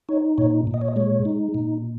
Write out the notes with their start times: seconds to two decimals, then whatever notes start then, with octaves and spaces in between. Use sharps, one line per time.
0.09 D#4 C#5
0.38 A#2 C#5
0.67 A#2
0.74 D#5
0.81 C#5
0.88 D#5
0.96 G#3 C#5
1.25 D#4
1.54 A#2